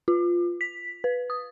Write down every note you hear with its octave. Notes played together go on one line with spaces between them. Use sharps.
F4
B6
B4
D#6